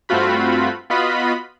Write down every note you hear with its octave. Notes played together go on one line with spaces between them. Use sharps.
G2 A3 C4 F4 F#4 B5
B3 F4 F#4 D#5 B5